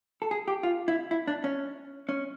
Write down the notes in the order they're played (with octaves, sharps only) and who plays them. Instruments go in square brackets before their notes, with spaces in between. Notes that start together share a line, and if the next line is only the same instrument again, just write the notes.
[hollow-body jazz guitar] A4
G#4
G4
F4
E4
E4
D4
C#4
C#4